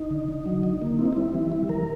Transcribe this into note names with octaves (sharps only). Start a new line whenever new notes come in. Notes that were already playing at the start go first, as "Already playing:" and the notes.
Already playing: D#4
D3
D3
F#3
D3
A#3
C4 E4
D#4
G3 E4
E3
G3
E3 A#4